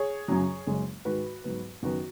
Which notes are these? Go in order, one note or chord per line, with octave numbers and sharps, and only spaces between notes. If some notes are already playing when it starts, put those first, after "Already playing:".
Already playing: G#4 C#5
F#2 C#3 F#3
F#1 F#2 C#3 G#3 C#4
G#2 D#3 G#3 F#4 B4
G#2 F#3 B3
F#2 D#3 B3 F#4